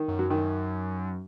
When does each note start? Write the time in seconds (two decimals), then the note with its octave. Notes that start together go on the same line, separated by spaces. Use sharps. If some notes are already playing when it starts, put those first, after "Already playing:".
Already playing: D#3
0.08 F#2
0.19 F#3
0.30 F#2 D#3